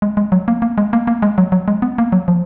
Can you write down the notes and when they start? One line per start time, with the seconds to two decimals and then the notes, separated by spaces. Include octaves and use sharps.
0.02 G#3
0.17 G#3
0.32 F#3
0.48 A#3
0.62 A#3
0.78 G#3
0.93 A#3
1.07 A#3
1.22 G#3
1.38 F#3
1.52 F#3
1.68 G#3
1.82 B3
1.98 A#3
2.12 F#3
2.28 F3